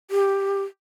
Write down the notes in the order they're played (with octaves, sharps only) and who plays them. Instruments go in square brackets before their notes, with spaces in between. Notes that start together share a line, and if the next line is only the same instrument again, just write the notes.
[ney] G4